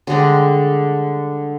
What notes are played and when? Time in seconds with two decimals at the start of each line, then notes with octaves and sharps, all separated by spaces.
0.07 D3 G3 G#3 D4